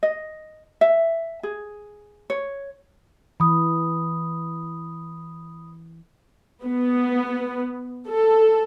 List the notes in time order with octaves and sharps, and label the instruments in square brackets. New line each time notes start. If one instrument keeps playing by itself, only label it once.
[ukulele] D#5
E5
G#4
C#5
[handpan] E3 [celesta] B5 D#6
[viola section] B3
A4